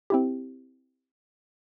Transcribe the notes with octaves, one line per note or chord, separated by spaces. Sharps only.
C4 E4 G4